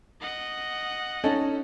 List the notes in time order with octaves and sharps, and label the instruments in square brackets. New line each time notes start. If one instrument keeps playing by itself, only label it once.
[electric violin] D#5 F#5
[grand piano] C#4 D#4 A4